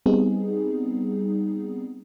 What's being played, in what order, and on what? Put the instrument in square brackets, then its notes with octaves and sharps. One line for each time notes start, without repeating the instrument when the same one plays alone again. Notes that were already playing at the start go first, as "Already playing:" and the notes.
[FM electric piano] G3 B3 C4 D#4 G#4